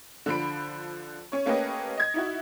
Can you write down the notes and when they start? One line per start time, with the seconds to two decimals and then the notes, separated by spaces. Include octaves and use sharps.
0.26 D3 F3 B5 D7
1.32 C#4 C#5
1.45 A3 A#3 C#4 G4 B4 D#5
1.97 D#5 G#6
2.14 D#4 E4 F#4